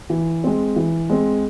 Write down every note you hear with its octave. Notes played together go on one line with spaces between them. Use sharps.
E3
G#3 C4
E3
G#3 C4